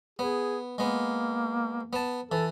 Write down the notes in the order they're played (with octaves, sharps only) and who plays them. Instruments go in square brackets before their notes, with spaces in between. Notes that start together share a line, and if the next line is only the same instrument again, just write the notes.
[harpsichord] B3 [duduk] G#4
[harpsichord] G#3 B3 [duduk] A#3
[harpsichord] B3 A5
[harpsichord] E3 [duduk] A4